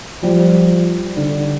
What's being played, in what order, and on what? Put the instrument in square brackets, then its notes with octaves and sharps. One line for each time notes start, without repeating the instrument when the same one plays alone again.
[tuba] F3 [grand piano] G3
[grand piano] D3